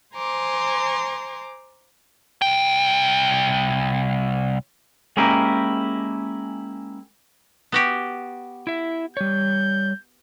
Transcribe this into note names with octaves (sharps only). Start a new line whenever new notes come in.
C5 G#5 A#5 C6 D6
C2 G5
G#3 A#3 C#4 E4 G4 A#4
B3 F#4 G4
E4 E5
G3 C#5 G6